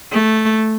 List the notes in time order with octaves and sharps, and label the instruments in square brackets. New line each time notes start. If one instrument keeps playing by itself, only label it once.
[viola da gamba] A3